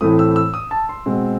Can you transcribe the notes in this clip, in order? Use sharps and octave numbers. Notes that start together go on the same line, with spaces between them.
A2 E3 A3 C4 D#6
E6
E6
D#6
A5
C6
B2 G#3 C4